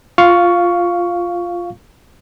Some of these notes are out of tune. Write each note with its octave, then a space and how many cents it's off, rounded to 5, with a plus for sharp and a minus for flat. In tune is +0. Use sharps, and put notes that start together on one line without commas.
F4 +0 F5 +0 C#6 +10